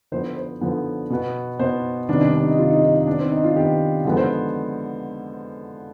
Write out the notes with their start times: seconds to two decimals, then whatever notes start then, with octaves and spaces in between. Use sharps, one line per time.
0.12 D3 F3 B3 C5
0.37 C5
0.61 D3 F3 B3
1.10 B2 B3
1.59 B2 B3 C5
2.09 C3 D#3 G3 B3 D4
2.21 D4
2.33 D4
2.45 D#4
2.58 C3 D#3 G3 B3 F4
2.70 D#4
2.83 D#4
2.95 D#4
3.07 D#3 B3 D4
3.19 C4
3.31 D#4
3.44 F4
3.56 D#3 B3 G4
4.05 D3 F3 G#3 B3
4.17 C5